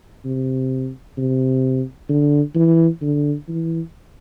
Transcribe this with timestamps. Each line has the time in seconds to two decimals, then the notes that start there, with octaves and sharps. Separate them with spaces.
0.25 C3
1.18 C3
2.09 D3
2.55 E3
3.02 D3
3.48 E3